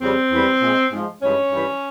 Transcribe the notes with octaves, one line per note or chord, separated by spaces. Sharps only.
F2 C#3 G3 C4
E2 E3 G3
A#2 G#3
G#2 F3 G#3
G2 E3 G#3 C#4
G2 E3 G3